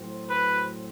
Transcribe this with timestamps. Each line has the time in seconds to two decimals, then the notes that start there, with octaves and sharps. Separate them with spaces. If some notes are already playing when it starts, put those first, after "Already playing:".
Already playing: A2 F#3 C4 F#4 C5
0.30 B4